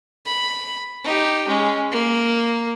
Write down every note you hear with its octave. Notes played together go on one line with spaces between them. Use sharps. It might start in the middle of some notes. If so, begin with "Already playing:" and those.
B5
D#4 G4
G#3 C#4
A#3